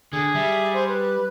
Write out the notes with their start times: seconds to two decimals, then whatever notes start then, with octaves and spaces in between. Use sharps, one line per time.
0.13 D3 G#4
0.35 G3 E5
0.74 C5
0.88 B4